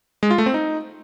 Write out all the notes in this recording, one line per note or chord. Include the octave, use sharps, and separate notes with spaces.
G#3
F4
A3
C4
D#4